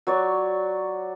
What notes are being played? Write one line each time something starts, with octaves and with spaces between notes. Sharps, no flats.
F#3 C#5 D5